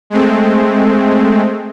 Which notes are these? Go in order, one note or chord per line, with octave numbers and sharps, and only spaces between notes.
G#3 A3 C4